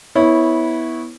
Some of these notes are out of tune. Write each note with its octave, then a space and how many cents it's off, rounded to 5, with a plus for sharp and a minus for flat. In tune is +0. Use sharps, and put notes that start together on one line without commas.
B3 +0 E4 -20 C#5 -5